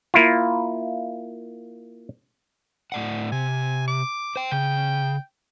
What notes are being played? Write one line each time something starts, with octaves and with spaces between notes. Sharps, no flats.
A#3 E4 F4
A2 D5 F#5
C3 G#5
D6
C5 G5
C#3 G5